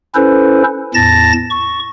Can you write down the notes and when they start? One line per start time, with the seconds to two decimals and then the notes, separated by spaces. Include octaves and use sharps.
0.15 C#4 E4 A4 B4 C5
0.94 E2 A2 A5 A6 A#6
1.50 C#6